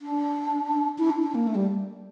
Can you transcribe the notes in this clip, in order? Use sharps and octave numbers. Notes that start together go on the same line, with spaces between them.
D4
E4
D4
D4
A#3
A3
G3